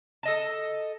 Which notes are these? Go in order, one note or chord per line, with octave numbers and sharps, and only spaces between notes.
A4 D#5 A5